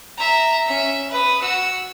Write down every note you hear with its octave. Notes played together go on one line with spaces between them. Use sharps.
E5 A#5
C#4 E5
B4 D#6
F#4 E6